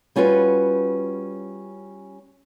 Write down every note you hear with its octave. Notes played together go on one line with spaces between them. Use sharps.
G3 C#4 F4 F#4 B4